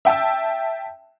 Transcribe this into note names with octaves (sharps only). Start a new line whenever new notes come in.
E5 G5 A5 E6